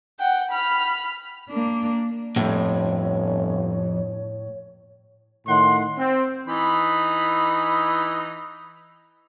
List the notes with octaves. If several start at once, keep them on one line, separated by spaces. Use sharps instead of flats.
F#5 G5
B5 F6
A#3 D4
G1 F2 A2 C#5
A2 D#3 F#5 C6
C4
E3 D#4 B5